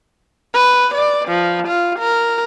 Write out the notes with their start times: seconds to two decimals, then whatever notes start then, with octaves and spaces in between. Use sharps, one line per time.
0.53 B4
0.94 D5
1.28 F3
1.68 F4
1.99 A#4